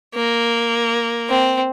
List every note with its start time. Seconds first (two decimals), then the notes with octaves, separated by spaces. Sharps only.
0.15 A#3
1.29 C4